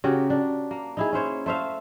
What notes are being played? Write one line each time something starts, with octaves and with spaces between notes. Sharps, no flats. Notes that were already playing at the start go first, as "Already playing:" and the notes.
C#3 F#4 G4 A#4
D4
A#3
D#4 E4 G#4
C#4 E4 C5 C#5
A3 C5 E5 F5